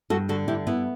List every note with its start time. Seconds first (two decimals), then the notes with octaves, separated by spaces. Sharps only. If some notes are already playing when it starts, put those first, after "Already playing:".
0.10 G2 F#4 A4
0.29 D3 F#4 A4
0.48 G2 E4 G4
0.67 B3 E4